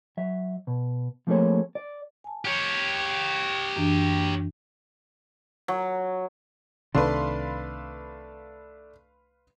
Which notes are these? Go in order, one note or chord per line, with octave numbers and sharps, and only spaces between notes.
F#3 E5
B2
F3 A3 A#3 C4 G#4 C#5
D5
G#5 A5
G4 C#5
F#2 E3 D4
F#3
C2 C3 D#3 A3 D4 B4 F5 C6